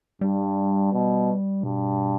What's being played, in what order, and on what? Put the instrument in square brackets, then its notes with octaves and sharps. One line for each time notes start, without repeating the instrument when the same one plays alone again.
[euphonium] G2 [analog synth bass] G3
[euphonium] B2
[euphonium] G2 [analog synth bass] B2